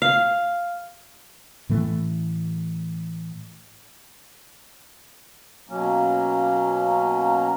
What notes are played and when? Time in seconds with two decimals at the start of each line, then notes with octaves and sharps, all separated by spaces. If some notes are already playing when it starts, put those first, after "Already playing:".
0.02 F5
1.69 A2 E3 A3
5.69 B2 F#3 A#3 C#4